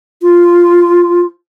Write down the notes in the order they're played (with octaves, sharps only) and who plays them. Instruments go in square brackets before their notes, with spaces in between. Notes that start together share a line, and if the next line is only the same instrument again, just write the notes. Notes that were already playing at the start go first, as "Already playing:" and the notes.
[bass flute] F4